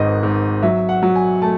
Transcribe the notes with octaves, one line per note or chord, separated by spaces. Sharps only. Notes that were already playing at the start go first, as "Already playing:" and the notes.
Already playing: G#1 G#2 D#3 B4 D#5
G#2
F#3 E5
F#5
F#3
G#5
A3 A5